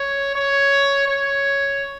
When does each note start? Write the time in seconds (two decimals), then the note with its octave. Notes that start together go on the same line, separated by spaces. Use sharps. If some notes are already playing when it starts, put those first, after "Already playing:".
Already playing: C#5
0.35 C#5
1.08 C#5